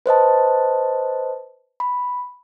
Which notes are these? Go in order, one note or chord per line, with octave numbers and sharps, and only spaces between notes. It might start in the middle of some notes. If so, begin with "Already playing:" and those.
B4 C5 D#5 A5
B5